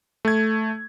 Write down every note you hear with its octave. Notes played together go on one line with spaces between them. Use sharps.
A3 G#6